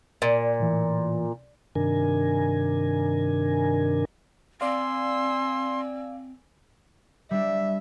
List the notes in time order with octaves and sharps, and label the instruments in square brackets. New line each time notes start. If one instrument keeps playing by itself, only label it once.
[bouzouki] A#2 [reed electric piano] D5
[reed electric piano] A2 E3
[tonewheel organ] G2 C3 D#3 D4 A#4 G#5
[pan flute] C4 [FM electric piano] D5 F5 [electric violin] G#5 E6 [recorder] C6
[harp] G3 D4 [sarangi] E5